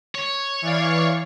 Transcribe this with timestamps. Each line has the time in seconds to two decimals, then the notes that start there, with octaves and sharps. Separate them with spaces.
0.15 C#5
0.62 E3 D5 F5